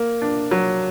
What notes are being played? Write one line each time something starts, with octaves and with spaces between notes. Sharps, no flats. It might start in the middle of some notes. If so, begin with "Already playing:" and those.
Already playing: A#3
D4
F#3